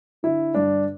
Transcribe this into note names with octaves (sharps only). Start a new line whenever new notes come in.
D3 E4
G2 D4